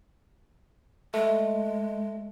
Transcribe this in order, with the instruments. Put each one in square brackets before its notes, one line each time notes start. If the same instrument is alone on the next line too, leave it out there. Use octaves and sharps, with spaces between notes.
[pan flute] G#3 [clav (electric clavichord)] A3